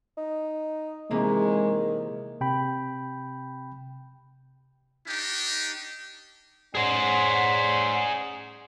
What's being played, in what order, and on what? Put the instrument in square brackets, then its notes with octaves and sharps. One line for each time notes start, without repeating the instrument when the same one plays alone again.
[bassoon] D#4
[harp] C3 E3 A#3 [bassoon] D#3 [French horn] G#3
[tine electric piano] C3 G5 B5
[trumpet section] D4 D#4 G4
[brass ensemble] C#4 D5 F#5 [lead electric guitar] G#4 C5